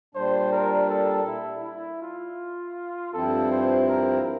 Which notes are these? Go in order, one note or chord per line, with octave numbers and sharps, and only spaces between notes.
A#2 G3 D4 C5
A#4
A4
E4
E4
F4
G2 F3 C4 E4 A4
C5
A#4